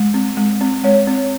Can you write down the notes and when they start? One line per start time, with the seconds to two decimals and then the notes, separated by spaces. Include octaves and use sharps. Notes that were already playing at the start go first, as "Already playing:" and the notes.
Already playing: G#3
0.14 C4
0.37 G#3
0.61 C4
0.84 G#3 C#5
1.07 C4